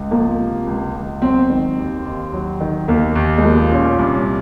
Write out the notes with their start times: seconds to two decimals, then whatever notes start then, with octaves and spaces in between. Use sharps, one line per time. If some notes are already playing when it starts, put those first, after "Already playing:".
Already playing: C#2
0.11 F3 A#3
0.39 C3
0.67 C#2
0.95 C#2
1.22 F#3 C4
1.50 D#3
1.78 D#2
2.05 D#2
2.33 F#3
2.61 D#3
2.88 D#2 A#3
3.15 D#2
3.38 G#3
3.44 F3 A#3
3.71 A#2 C#4
3.99 C2 C#4